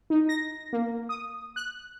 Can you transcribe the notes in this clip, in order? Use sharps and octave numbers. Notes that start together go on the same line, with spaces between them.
D#4
A#6
A#3
D#6
F#6